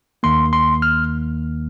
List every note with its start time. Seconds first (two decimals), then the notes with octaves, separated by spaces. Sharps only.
0.23 D#2 D#3 A#3 C6
0.53 C6
0.82 F6